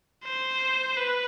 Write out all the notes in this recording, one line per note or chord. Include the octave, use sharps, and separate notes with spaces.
C5
B4